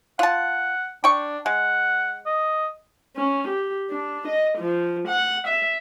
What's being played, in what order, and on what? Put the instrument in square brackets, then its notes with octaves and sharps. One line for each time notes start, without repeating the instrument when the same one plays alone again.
[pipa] F4 A5 [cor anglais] F#5
[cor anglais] D4 [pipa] G5 C#6
[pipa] G#3 [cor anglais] F#5
[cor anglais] D#5
[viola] C#4
G4
D4
D#5
F3
F#5
E5